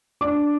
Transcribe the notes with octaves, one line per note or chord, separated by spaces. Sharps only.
D4 D6